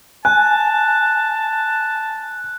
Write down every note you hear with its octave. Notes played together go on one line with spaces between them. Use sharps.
G#5 A5 F#6